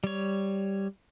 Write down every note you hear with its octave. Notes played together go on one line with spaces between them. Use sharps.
G3 C#5